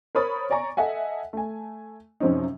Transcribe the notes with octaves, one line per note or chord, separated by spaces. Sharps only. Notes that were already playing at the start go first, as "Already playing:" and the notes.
A#4 C5 C#5 B5 D#6 A6
C#5 D5 G#5 A#5 C#6
A4 D#5 E5 F#5 G#5
A3 G#5
F#2 C3 F3 C4 C#4 D#4